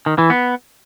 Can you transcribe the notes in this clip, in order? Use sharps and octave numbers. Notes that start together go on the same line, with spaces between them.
D#3
E3
B3